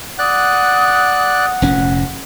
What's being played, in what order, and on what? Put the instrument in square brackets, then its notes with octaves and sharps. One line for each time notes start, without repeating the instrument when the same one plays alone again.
[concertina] D5 F#6 [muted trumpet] F#5 [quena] D#6
[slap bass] F1 A#2 C#4